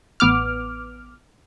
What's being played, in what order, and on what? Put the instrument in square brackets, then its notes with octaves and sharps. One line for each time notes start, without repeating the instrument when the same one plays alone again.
[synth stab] A1 B3 D6 F6